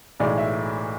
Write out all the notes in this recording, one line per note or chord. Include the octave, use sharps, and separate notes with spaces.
B1 A2 E3 G#3 D5
E5